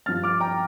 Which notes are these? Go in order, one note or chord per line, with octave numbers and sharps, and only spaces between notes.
G2 F3 F6 A6
D6 F6
G5 A#5